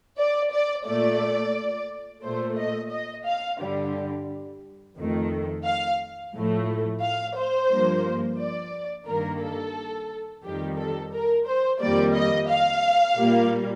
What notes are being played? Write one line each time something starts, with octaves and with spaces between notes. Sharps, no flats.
D5
D5
A#2 A3 D5
A#2 A3 C5
D#5
D#5
F5
G2 D3 G3
F2 D#3 A3
F5
A2 F3 A3
F5
C5
G2 F3 A#3
D5
G2 D#3 A#3 A#4
A4
F2 D#3 G3 G4
A4
A#4
C5
F2 D#3 G3 A#3 D5
D#5
F5
A#2 G3 A#3